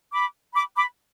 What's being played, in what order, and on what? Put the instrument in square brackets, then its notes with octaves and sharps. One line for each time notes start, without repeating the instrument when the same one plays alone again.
[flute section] B5 D6
B5 D6
B5 D6